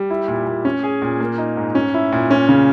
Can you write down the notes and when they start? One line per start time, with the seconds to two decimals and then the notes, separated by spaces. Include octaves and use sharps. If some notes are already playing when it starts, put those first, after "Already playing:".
Already playing: G3
0.10 E4
0.28 A#2
0.47 A#2
0.65 C#4
0.83 G#4
1.02 A#2
1.20 A#3
1.38 D#4
1.57 G#2
1.75 C#4
1.94 E4
2.12 A#2
2.31 C#4
2.49 C#3